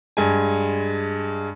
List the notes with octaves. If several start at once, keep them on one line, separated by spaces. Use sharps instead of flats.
G2 G#3 G#5